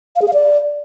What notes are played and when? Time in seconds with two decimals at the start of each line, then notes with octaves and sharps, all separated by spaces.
0.16 F5
0.22 G#4
0.28 F5
0.34 D5